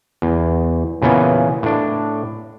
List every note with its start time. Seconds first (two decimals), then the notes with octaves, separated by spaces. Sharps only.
0.22 E2
1.02 A#2 C#3 E3 B3
1.63 A2 D4